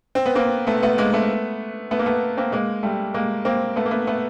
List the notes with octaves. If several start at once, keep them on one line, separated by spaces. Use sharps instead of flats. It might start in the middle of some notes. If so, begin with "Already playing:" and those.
C4
B3
A#3 C4
A3 B3
A3 B3
G#3 A#3
A3 B3
A3 B3
A#3
A3 B3
A#3 C4
G#3 A#3
G3 A3
G#3 A#3
A#3 C4
A3 B3
A#3
A3 B3
A3 B3